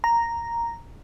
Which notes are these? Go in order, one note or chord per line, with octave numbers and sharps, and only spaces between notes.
A#5